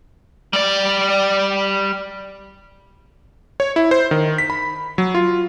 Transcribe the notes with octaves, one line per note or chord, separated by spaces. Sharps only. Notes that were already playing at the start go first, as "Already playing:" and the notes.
G3 D5
C#5
E4
C5
D#3
B6
B5
F#3
F4